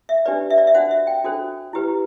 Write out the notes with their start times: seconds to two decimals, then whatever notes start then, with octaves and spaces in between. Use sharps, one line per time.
0.09 E5
0.26 D4 G4 B4 D5
0.50 E5
0.58 D5
0.67 E5
0.74 D4 F#4 C5 F#5
0.91 E5
1.07 G5
1.24 D4 F#4 A4 C5
1.73 E4 G4 B4